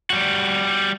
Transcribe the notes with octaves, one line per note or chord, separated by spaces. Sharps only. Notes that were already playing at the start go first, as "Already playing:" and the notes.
G3 F#4